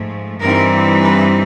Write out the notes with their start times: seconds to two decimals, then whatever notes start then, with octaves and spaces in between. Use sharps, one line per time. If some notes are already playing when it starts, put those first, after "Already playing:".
Already playing: G#2 F3 A3
0.40 G2 E3 G3 C4 D#4 A#4
1.01 B4